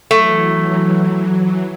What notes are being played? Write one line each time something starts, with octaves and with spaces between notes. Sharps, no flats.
E3 F#3 A3